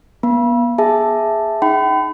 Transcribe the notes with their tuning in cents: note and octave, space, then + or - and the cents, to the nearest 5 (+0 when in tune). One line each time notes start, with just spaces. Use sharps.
B3 -35 B5 -35
G#4 +0 E5 +0 A5 +0
D#4 +0 G5 -40 B5 +35